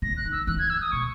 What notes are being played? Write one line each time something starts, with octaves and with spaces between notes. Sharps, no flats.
C#3 A#6
F#6
D#3
E6
E3 F#6
G#6
E6
D#6
B2 C#6